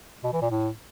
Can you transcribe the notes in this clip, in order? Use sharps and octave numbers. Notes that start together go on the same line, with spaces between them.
B2
E3
A#2
A2